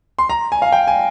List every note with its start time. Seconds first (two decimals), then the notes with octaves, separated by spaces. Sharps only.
0.19 C6
0.30 A#5
0.52 G#5
0.62 F5
0.72 G5
0.87 G#5